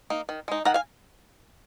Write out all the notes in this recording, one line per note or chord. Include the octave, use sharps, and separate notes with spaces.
A#3 D#4
D#3
G#3 D#4
D#3 F#5 A#5
F5 G#5